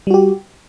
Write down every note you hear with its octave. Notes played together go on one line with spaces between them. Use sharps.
G3 F#4 G4